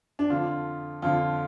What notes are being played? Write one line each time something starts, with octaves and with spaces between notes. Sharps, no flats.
D4
F2 D3 F4
F2 D3 F4